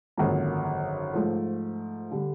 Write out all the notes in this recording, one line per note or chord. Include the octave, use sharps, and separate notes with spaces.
G#1 F#2 D3 F3 A#3
G#2 F3 A3
D3 G3